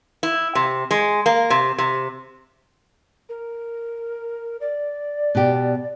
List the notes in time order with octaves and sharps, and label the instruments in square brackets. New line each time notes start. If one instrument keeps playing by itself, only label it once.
[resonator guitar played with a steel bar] E4
C3
G#3
A#3
C3
C3
[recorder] A#4
D5
[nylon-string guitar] B2 G4